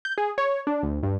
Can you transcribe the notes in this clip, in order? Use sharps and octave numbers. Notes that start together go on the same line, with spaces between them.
G6
G#4
C#5
D4
D2
G2